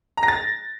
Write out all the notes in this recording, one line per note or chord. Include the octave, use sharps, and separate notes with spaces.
A#5
A#6
A6